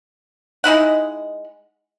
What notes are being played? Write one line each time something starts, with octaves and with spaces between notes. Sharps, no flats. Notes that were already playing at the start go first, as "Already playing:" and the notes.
G#3 D#4 E4 F#5